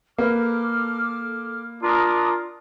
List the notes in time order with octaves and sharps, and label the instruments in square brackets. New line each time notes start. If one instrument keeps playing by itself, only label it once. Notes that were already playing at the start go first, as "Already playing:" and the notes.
[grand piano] A#3 B4 [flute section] A4 D6 F6
[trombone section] D4 A#4 [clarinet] F4 [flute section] D6 D#6